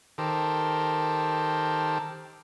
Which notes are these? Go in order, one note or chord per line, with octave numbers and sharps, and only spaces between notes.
D#3 G4 A4 A#4 C5